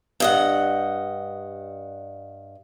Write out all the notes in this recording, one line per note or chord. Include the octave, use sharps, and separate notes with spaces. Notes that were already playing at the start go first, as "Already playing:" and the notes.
G2 D#5 F#5